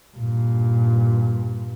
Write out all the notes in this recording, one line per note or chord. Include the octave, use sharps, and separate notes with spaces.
G2 A#2